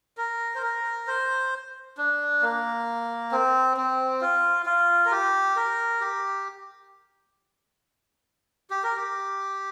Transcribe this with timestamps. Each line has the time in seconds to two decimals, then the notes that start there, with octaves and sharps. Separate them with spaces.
0.17 A#4
0.55 C5
0.62 A#4
1.07 C5
1.98 D4
2.42 A#3
3.32 C4
3.77 C4
4.21 F4
4.66 F4
5.06 A#4
5.11 G4
5.56 A#4
6.01 G4
8.70 G4
8.84 A#4
8.96 G4